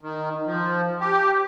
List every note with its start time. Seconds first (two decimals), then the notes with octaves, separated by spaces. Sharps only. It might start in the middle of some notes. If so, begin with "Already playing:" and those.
0.01 D#3
0.47 F3
1.00 G4